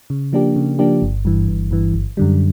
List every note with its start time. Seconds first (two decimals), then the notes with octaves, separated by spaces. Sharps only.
0.10 C#3
0.33 F3 A#3 D4 G4
0.56 C#3
0.79 F3 A#3 D4 G4
1.02 G1
1.25 G2 E3
1.48 G1
1.71 G2 E3
1.94 G1
2.17 F#2 D3 G3